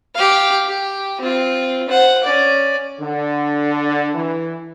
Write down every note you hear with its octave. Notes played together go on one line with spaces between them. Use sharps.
G4 F5
G4
C4 F4
C5 F#5
C#4 D5
D3
E3